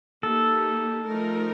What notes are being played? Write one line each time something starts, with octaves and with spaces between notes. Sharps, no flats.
A#3 D#4 G4 A4
F3 A3 D#4 A#4